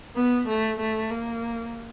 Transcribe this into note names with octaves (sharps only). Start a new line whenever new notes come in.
B3
A3
A3
A#3